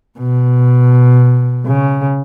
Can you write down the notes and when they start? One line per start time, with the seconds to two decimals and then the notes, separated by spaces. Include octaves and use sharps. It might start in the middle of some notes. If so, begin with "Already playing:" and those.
0.19 B2
1.66 C#3